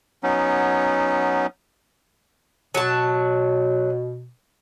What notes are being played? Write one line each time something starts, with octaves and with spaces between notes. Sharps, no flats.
F#3 B3 C#4 D#4
B2 F#3 A5